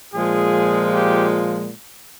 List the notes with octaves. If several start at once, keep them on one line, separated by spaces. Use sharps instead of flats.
A#2 F3 G#3 G#4
G4